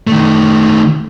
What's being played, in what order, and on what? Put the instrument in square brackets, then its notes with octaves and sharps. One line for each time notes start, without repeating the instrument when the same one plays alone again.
[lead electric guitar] D#3 A3